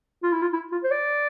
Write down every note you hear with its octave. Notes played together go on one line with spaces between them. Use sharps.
F4
E4
F4
E4
F4
C5
D5